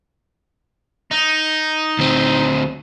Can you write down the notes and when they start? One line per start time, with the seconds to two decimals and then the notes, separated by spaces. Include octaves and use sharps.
1.11 D#4
1.99 D2 C4